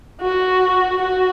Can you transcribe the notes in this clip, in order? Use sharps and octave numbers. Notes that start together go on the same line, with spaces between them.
F#4
F#4